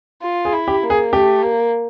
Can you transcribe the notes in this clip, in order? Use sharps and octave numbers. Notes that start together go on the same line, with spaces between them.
F4
G#4
E4
G4
A#3
G#4
A3 G4
A#3